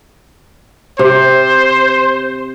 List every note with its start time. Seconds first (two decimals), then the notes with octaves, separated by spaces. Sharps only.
0.99 C3 C5